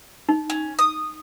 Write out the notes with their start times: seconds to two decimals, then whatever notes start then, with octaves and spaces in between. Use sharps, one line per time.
0.29 D#4
0.50 C#4
0.79 D#6